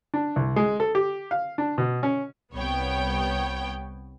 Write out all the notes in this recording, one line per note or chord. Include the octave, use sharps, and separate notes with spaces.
D4
C2
G#3
A4
G4
F5
D4
B2
C#4
C2 B3 C#5 G5